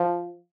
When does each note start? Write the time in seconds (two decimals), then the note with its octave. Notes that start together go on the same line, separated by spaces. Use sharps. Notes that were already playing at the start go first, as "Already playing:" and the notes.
Already playing: F3